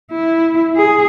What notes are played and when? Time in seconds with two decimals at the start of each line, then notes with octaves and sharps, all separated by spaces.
0.11 E4
0.76 G#4